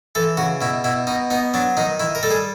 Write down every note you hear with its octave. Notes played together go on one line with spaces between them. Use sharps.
E3 A4
C#3 F#4
B2 E4
B2 E4
B2 D#4
B3 D#4
F#3 D4
D#3 D#4
D#3 E4
A#4
G3 A4
G#4